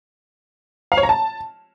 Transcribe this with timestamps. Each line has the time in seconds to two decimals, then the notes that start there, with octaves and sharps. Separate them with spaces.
0.92 F5
0.97 C#5
1.03 A#5
1.09 A5